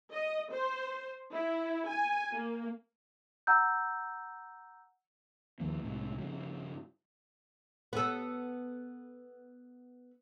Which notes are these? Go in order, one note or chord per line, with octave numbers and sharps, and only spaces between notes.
D#5
C5
E4
G#5
A#3
F#5 A#5 E6 G6
D#2 D#3 F3 A#3
C2 A2 C3 G#3
G2 C#3 F3
B3 A4